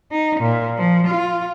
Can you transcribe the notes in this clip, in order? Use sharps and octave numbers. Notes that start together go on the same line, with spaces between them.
D#4
A#2
F3
F4